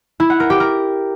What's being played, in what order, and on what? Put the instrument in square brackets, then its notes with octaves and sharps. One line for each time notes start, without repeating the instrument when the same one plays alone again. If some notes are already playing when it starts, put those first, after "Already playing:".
[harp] E4
F#5
A#4
G4
A#4